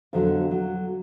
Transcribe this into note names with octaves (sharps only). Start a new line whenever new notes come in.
F2 B2 D3 F#3
F#3